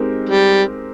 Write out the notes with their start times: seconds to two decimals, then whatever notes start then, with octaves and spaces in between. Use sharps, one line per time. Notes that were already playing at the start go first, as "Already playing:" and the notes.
Already playing: G#3 C4 D#4 G4 A#4
0.29 G3